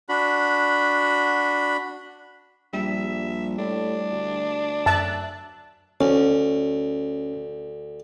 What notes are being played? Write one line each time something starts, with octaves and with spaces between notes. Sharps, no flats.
D4 F#4 B5
A#1 G3 E5
A2 D4
D2
F#2 E5 A5 F#6
D2 C#4